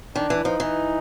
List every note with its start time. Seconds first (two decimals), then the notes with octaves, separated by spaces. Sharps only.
0.16 D#3 D4
0.30 E3
0.45 F3 D#4
0.60 E3